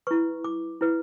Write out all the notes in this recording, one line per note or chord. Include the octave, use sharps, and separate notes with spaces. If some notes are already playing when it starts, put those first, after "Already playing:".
E4 B4 C#6
D6
E4 B4